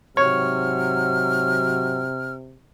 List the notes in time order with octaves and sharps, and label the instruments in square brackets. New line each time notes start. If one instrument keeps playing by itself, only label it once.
[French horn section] G#2 F#3 [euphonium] C3 [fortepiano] C#5 [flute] F6